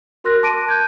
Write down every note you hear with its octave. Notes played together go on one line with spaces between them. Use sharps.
F#4 A#4 C6 F6 F#6 A#6
A5 D6 A#6 D7 D#7
G6 G#6